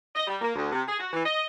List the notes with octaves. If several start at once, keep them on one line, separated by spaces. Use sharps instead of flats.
D#5
G3
A#3
D2
C3
G#4
F#4
E3
D#5